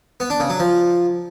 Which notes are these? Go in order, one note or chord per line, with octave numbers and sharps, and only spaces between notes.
B3
D4
C#3
F#3
F3